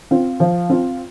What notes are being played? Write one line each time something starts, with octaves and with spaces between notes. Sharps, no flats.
C4 F4
F3
C4 F4